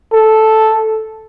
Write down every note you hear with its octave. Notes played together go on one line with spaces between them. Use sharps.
A4